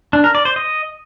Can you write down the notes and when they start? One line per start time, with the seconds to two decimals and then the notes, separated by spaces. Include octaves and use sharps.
0.13 D4
0.24 A#4
0.35 D5
0.45 C5
0.56 D#5